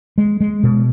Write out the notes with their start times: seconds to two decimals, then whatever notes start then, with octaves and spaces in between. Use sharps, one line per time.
0.18 G#3
0.40 G#3
0.63 B2